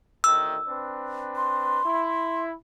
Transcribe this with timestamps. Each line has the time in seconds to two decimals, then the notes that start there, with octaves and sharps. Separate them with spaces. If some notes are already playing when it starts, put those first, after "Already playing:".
0.24 D2 A2 D#3 E6
0.67 C4 D4 B4
1.36 C6
1.85 E4